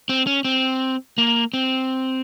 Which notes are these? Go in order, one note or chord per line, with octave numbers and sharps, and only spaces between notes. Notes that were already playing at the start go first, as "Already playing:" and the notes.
C4
C#4
C4
A#3
C4